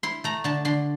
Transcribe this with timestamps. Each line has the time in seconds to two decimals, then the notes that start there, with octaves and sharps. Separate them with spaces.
0.03 E4 C6
0.24 A3 A#5
0.44 D3 A5
0.65 D3 C6